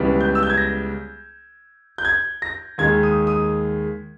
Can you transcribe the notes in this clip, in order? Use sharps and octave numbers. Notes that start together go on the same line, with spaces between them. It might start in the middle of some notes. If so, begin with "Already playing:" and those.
Already playing: C#2 C#3 E3 G3 B3
G6
E6
G6
G#6
A#6
G6
G#6
A#6
D#2 D#3 G#3 G#6
D#6
D#6